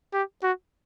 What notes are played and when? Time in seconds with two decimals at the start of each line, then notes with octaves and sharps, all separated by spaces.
0.13 G4
0.43 F#4